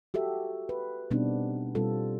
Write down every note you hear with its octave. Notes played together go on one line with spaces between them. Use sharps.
F#4 G4 A4 E5
B4
B2 G3 B3 C4 D4 D#4
B2 G3 C4 F4 A4